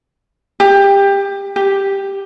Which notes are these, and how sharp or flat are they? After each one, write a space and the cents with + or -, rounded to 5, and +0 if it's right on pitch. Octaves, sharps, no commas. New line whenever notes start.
G4 +20
G4 +5